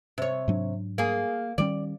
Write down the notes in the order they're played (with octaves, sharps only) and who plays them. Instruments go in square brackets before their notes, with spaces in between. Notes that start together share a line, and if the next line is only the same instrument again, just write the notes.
[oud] C3 C#5
[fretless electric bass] G#2 F#3 D4
[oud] A#3 G#4
[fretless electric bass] D#3 G3 C#4 [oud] D5